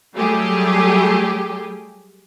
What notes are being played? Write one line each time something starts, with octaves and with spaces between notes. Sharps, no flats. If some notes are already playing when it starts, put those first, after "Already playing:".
F#3 G3 A3 G4 G#4